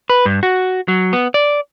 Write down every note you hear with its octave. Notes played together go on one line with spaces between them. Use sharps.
B4
G2
F#4
F#3
B3
D5